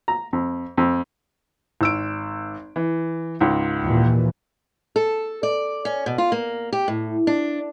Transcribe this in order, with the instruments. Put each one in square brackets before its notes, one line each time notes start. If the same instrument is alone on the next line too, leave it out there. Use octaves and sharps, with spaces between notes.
[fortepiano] A#5
F2
F2
[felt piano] G#1 E6 D7
E3
C#2 G#2
[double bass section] D#2 A#2 E3
[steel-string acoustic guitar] A4
D5
C#4
B2
F4
A#3
G4
A2
D4